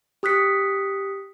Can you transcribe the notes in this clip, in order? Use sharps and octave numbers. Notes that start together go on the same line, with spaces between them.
G4 D#6 F#6 B6 C#7